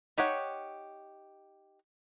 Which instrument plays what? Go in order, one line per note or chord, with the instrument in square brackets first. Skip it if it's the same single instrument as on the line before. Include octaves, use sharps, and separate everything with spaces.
[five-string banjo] D#4 G4 C#5 F#5